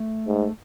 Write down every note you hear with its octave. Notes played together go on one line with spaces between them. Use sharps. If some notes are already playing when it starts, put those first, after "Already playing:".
Already playing: A3
G#2